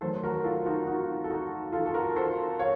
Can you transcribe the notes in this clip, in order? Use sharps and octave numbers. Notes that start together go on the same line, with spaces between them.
D#3 F#3 A3 A4 C5
F#4 A#4
F4 A4
D#4 F#4
D#4 F#4
A4
D#4 F#4
F4 A4
A4
F#4 A#4
A4 C5
C#5 F5